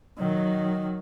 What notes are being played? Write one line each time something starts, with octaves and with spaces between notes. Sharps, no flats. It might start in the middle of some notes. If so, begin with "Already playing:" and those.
D#3 F#3